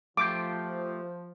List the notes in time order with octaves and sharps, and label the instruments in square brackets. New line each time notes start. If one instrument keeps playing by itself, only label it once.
[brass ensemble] F3 [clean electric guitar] A3 F4 G4 [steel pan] D6